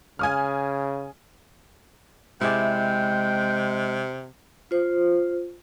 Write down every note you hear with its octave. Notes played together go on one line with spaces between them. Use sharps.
C#3 G#5 D#6 F6
C3 G#3 E4 G#4 D5 G5
F4 C5